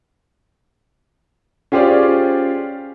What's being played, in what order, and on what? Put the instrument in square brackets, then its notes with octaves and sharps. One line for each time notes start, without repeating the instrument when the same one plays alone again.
[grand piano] C#4 F4 G4 G#4 C5 D5